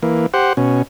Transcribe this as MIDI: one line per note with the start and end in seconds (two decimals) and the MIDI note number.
0.03 0.26 52
0.03 0.26 58
0.34 0.53 67
0.34 0.53 72
0.34 0.53 78
0.57 0.82 47
0.57 0.82 61